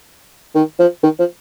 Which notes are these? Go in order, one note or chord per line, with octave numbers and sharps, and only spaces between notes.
D#3
F3
D#3
F3